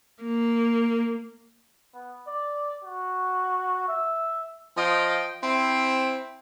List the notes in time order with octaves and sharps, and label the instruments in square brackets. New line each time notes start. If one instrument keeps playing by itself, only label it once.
[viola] A#3
[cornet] B3
D5
F#4
E5
[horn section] F3 D#5 F5 G5
C4 E4